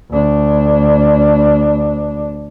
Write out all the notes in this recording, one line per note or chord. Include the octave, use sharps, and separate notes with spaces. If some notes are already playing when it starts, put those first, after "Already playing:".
D2 D4